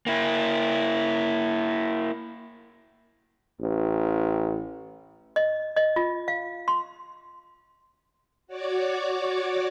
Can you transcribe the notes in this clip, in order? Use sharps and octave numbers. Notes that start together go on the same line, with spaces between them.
A#3 E4
A1
D#5
D#5
F4
F5
C6
F#4 C#5 D5 D6